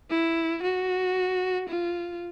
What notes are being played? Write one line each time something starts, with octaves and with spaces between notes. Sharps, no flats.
E4
F#4
F4